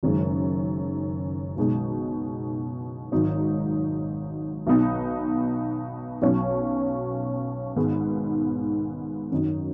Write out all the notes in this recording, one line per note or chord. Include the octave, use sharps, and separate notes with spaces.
F#1 F#2 D#3 G#3
B1 B2 G#3 D#4
G#1 G#2 F#3 D#4
B1 B2 B3 D#4
B1 B2 F#3 C#4
G#2 D#3 G#3 B3 D#4
F#2 D#3 F#3 D#4